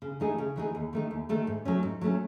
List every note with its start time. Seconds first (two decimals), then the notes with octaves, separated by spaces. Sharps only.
0.02 C#3
0.20 E3 A3 D#4 G#4
0.38 C#3
0.56 E3 A3 D#4 G#4
0.75 D#2
0.93 D#3 A3 D#4
1.11 D#2
1.29 D#3 A3 D#4
1.47 G#2
1.65 F#3 A3 C#4
1.83 G#2
2.01 F#3 A3 C#4